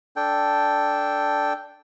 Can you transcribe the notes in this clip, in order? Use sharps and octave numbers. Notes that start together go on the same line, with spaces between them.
D4 A4 G5